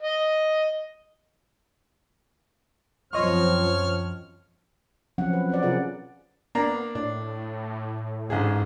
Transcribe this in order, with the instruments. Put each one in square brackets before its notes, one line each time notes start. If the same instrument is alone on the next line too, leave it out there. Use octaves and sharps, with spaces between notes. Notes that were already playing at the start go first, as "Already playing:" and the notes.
[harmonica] D#5
[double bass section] F#2 F3 C4 [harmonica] C#5 F6 [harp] D#5 C6 C#6
[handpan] F3 F#3 C4 C#4 F#5
B4
C4 C#4 C5 D5
C3 C#4 F4 G#4 A#4 F#5
[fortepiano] A#3 D4 A#5 [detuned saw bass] B3
[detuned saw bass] A2 [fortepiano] D4
[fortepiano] A1 D3 G#4 [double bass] G#2